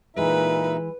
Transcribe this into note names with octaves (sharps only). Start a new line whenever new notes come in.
A#2 E3 G#3 D#4 B4 E5